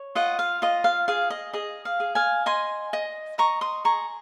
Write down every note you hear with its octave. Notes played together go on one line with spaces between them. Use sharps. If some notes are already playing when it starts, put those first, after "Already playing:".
Already playing: C#5
F4 D#5 F#5
F5
F4 D#5
F5
G#4 F5
D#5
G#4 D#5
F5
G#4
F5 G#5
D#5 G#5 C6
D#5
D#5 A#5 C#6
C6 D#6
G#4 A#5 C#6